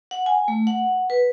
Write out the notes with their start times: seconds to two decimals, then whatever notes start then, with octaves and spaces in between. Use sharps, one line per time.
0.11 F#5
0.26 G#5
0.48 A3
0.67 F#5
1.10 B4